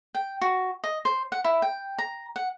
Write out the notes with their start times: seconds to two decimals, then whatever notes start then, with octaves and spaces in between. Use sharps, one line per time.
0.15 G5
0.41 F#4
0.84 D#5
1.05 C5
1.32 F#5
1.44 E4
1.62 G5
1.98 A#5
2.36 F#5